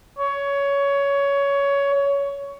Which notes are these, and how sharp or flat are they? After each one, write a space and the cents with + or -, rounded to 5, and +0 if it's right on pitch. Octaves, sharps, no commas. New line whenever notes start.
C#5 +15